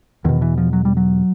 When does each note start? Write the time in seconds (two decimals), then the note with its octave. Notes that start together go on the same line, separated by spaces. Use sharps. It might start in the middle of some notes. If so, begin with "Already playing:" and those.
0.25 E2 B2 D#3
0.42 E3
0.58 F3
0.73 F#3
0.85 G3
0.97 F#3